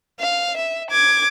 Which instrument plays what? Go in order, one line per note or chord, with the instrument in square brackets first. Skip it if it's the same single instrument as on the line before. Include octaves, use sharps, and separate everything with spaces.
[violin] F5
E5
D6 G#6